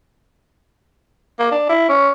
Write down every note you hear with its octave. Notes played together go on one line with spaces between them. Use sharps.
A#3
D4
E4
C#4